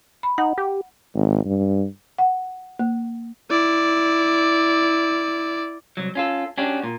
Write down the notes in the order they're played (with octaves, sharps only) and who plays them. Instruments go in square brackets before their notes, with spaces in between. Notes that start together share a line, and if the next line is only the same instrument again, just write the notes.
[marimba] B5
[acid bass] D#4 [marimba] F#5
[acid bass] G4
[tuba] G#1
G2
[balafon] F#5
A#3
[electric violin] E4 D5
[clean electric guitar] C2 F#3
C#4 F4 A4
C#4 D4 F#4 G4
A#2